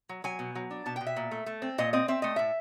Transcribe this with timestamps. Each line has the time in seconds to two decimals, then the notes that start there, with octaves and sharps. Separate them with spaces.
0.09 F#3
0.24 F#3 G#5
0.39 B2
0.55 F#3
0.71 D4
0.86 B2 A5
0.96 G5
1.01 B2
1.07 E5
1.16 A#2
1.31 A3
1.46 A3
1.62 C4
1.78 A#2 D#5
1.93 C4 D#5
2.08 C4 E5
2.22 A3 D#5
2.36 A2 E5